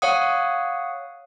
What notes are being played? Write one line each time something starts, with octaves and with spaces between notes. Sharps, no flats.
C#5 F5 F#5 D#6